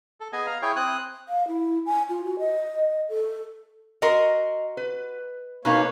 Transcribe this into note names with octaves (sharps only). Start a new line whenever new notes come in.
A4
B3 G#4 D#5 G#5
F5 A#5
E4 G#4 C#5 G5
C4 D#6 F#6
F5
E4
G#5
F4
F#4
D#5
A4
F#4 A#4 D#5 C6
B4
B2 A#3 D#4 B4 C#5 F5